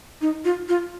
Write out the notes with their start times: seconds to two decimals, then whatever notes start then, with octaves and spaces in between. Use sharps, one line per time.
0.21 D#4
0.45 F4
0.69 F4